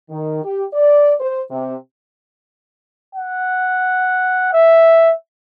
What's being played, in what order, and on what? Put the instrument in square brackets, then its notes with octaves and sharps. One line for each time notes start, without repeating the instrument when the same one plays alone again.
[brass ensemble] D#3
G4
D5
C5
C3
[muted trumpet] F#5
E5